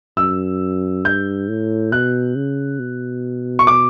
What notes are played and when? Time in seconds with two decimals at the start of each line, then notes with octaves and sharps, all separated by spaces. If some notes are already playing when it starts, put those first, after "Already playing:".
0.17 F#2 E6
1.05 G2 G6
1.48 A2
1.92 B2 F#6
2.36 C#3
2.79 B2
3.59 C#6
3.67 D6